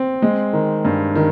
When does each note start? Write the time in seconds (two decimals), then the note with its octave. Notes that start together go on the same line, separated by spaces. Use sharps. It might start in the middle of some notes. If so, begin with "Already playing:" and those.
Already playing: C4
0.22 G#3
0.53 D#3
0.85 G2
1.15 D#3